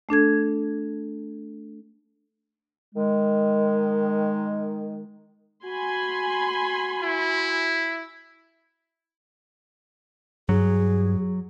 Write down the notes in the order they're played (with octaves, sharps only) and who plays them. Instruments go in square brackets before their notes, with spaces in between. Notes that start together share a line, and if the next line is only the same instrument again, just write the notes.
[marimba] A3 D4 A4 G#6
[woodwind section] D#3 G#3
[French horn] F#4 [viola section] G#5 B5 C6
[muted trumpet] E4
[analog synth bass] G2 [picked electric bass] F#3 [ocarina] G#4